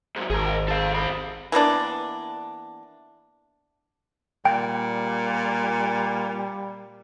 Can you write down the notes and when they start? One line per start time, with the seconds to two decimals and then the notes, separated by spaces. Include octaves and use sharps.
0.16 G#2 F#3
0.30 G#1 G#4 A#4
0.68 A4 F5
0.94 C3 B5
1.52 E3 A#3 B3 D4
4.45 A#2 G3 G5